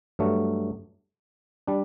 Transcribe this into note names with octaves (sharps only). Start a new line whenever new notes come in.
G2 F#3 A3
G3 D4